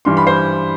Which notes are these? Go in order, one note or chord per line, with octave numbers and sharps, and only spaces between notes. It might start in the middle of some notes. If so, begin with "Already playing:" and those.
G2 E3 G3 C6
B5
C5 C6